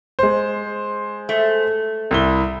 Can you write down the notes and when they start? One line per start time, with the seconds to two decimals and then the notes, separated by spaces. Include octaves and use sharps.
0.19 G#3 C5
1.29 A3
2.11 C2 E4 G7